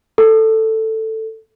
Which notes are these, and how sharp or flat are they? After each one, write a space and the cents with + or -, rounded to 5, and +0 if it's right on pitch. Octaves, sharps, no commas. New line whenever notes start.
A4 +10